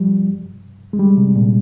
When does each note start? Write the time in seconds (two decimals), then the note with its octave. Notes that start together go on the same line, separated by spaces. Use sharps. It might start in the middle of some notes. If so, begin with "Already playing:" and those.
Already playing: F3 G3
0.93 G#3
0.99 G3
1.17 C3
1.36 A#2